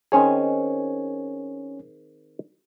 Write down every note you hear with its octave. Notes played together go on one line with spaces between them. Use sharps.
D#3 C4 C#4 G#4 C#5 G#5